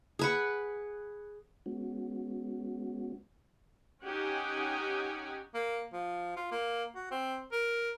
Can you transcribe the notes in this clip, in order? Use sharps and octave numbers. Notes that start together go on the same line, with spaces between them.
G#4 B4 F#5
G#3 B3 C#4 F#4
C#4 D#4 G4 F#5 G#5
A#3
F3
F4
A#3
F#4
C4
A#4